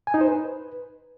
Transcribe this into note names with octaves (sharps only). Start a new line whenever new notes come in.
G#5
D#4
C5
B4